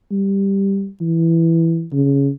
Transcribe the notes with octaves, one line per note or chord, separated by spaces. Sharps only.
G3
E3
C#3